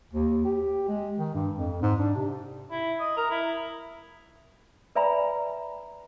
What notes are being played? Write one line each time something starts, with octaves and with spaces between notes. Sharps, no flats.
D#2
G4
G#3
D#3
G2
F2
G#2
D4
C3
E4
D#5
A#4
E4
B4 D5 E5 G#5 A#5 B5